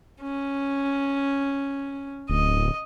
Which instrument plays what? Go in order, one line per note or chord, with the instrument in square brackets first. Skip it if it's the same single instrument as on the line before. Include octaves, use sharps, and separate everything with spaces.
[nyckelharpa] C#4
[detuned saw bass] D1 [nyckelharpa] D#5